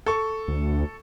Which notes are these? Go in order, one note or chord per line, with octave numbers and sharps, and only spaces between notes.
A4 C#6
D2